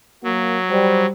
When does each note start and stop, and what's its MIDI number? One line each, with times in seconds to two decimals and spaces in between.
0.24 1.06 54
0.24 0.58 58
0.70 1.11 55
0.70 1.10 72